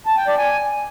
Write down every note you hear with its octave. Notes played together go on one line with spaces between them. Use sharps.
A5
G5
D5
G#5